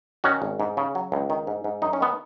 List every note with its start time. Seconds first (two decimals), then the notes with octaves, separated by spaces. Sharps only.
0.24 D#3 C#4 F#4
0.42 G#1
0.60 G#2
0.77 C#3
0.95 F#3
1.12 C#2
1.30 D#3
1.47 G#2
1.64 G#2
1.82 F#2 D#4
1.93 C#4
2.00 D#3 B3